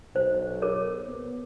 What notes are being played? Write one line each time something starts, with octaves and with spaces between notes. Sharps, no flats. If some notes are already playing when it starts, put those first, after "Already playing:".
B1 C5
G#4 A#4 C#5
B3